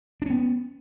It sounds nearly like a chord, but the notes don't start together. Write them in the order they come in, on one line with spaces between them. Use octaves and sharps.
D4 C#4 B3